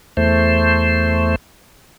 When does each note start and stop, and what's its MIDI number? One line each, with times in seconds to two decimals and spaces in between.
0.17 1.35 40
0.17 1.35 57
0.17 1.35 72